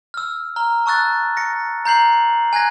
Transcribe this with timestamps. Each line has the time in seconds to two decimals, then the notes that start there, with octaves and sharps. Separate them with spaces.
0.14 E6 F6
0.56 A#5 F6 G7
0.86 A5 C#6 E6 F#6 A6
1.37 A#6 C#7
1.86 A#5 G6 C7 F#7
2.53 G#5 F#6 G#6 A#6